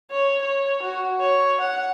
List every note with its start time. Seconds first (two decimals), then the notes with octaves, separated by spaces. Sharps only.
0.11 C#5
0.41 C#5
0.82 F#4
1.20 C#5
1.60 F#5